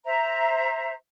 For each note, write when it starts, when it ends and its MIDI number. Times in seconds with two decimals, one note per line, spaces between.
0.04 0.92 72
0.04 0.92 76
0.04 0.92 82